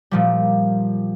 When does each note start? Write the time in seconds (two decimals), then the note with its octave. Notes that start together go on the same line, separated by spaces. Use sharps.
0.11 A#2 F3 G3